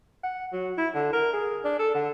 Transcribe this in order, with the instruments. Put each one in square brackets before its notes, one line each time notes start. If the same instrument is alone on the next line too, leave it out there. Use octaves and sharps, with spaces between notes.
[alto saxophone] F#5
F#3
E4
D3
A#4
G#4
D4
A4
D3